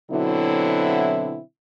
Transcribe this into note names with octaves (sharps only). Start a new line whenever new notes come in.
B2 D3 F#3 C4 E4